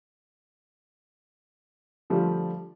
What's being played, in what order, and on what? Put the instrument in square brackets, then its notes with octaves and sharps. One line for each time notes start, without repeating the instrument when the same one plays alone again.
[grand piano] D3 F3 G3 A3 F4